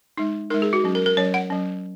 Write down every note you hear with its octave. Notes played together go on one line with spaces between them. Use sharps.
G#3 D#4
G#3 D#4 A#4
G#4
F#4
F#3 C#4
A#4
A#4
F#3 C#4 C#5
F#5
F#3 C#4